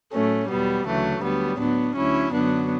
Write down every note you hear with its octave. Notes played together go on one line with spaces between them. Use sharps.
A2 F#3 A3 C#4
E2 B2 F#3 G3 B3
D2 C#3 E3 F#3 A3
D2 D3 F#3 G3 B3
A2 F#3 B3 D4
D2 D3 F#3 C#4 E4
F#2 D3 F#3 B3 D4